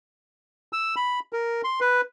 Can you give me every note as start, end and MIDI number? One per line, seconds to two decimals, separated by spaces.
0.73 0.95 88
0.96 1.20 83
1.33 1.62 70
1.64 1.80 84
1.81 2.01 71